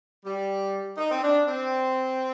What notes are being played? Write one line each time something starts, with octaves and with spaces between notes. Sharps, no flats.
G3
D#4
C4
D4
C4